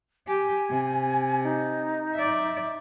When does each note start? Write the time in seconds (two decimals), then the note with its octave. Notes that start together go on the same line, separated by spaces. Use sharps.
0.28 G4 G#5
0.70 C3
1.44 D#4
2.15 D5 E5